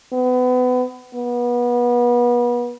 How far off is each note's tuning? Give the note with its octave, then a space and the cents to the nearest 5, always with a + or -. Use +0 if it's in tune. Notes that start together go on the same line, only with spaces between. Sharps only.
B3 +30
B3 -30